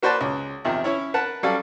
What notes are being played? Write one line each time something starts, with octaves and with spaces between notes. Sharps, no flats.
A#3 F#4 B4 C5 D5 A5
C#2
E2 C3 D#3 F3
C#4 E4 C#5
A#4 B4 F#5 A5
F#3 G3 C#4 A4 D5 F5